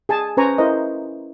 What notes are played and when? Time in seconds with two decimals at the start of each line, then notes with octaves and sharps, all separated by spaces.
0.09 G#4 G#5 A5
0.37 C#4 B4 C5 G#5 A#5 C#6
0.58 E4 A#4 C5 D#5